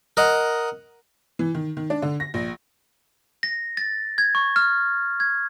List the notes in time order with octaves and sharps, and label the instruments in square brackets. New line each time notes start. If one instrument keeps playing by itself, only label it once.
[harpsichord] A#4 D#5 F#5
[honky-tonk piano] E3
D#3
D#3
D4
D3
A#6
A#1
[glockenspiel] A#6
A6
G#6
C#6
F6
G#6